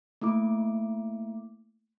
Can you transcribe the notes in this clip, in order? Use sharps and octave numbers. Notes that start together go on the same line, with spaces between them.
A3 A#3 E4 D6